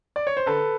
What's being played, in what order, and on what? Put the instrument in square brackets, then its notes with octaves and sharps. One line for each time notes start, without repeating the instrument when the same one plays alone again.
[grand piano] D5
C#5
C5
D3 A4 B4